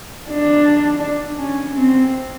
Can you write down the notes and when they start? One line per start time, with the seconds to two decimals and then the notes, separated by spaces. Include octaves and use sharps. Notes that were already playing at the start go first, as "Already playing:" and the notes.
0.30 D4
1.38 C#4
1.75 C4